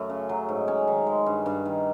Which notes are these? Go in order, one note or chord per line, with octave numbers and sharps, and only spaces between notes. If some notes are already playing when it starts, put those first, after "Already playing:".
Already playing: F#2 A3
C#3
F#3
G#2
C#4
D#3
G#3
G2
G2
D#3